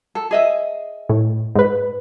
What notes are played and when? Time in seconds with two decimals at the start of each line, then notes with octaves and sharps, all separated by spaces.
0.15 A4
0.31 G#4 D#5 E5
1.09 A2
1.56 G#2 B4